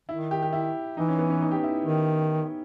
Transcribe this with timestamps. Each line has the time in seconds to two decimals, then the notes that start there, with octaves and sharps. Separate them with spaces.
0.09 D#3 E4
0.31 G4
0.42 G4
0.53 E4
0.97 E3 D#4
1.09 C#4
1.19 B3
1.30 C#4
1.42 D#4
1.51 G4
1.63 E4
1.85 D#3